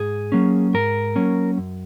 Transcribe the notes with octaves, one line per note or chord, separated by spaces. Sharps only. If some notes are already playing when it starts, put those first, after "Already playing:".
Already playing: G#2 G#4
F#3 A#3 C#4
G#2 A#4
F#3 A#3 C#4
F#2